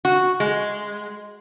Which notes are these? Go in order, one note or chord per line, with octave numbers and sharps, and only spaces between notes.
F#4
G#3